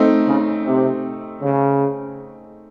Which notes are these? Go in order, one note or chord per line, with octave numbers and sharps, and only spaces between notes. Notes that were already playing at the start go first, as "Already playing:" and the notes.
Already playing: A3 C4 D#4
C#3
C3
C#3